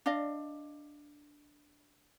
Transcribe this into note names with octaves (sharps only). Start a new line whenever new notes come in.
D4 D5 D#5 F5